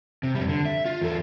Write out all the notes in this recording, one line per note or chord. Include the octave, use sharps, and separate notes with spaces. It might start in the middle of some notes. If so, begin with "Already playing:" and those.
C3
F2 G3
D3
E5
F4
E2 A4